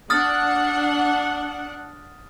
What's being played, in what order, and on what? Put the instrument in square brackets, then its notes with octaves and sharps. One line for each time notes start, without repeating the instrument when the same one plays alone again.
[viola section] D4 F#5 [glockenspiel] D#6 F6 A6